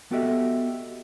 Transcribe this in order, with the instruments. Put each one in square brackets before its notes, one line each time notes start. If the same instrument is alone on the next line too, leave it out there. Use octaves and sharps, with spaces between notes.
[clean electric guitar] B3 F#4 G4 A4 D#5 E5